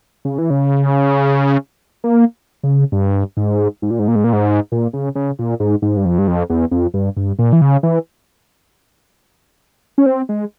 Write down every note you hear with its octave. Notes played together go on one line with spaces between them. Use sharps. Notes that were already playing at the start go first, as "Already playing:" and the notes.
C#3
E3
C#3
A#3
C#3
G2
G#2
G#2
A#2
G#2
A#2
G#2
A#2
G#2
A#2
C#3
C#3
A#2
G#2
G#2
G2
F2
G2
F2
E2
F2
G2
G2
A#2
E3
C#3
E3
C#4
C4
G#3